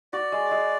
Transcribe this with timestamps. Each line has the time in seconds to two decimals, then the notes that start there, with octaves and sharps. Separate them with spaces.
0.13 F#4 D5
0.32 G#3
0.51 G#3